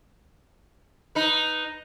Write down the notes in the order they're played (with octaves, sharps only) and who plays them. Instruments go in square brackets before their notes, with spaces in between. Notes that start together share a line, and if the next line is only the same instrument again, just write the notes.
[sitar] D#4 B4